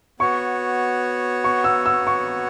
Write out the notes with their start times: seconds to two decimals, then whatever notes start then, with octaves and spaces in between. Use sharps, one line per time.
0.20 B3 F#4 C#5 C#6
1.44 C#6
1.64 E6
1.86 E6
2.07 C#6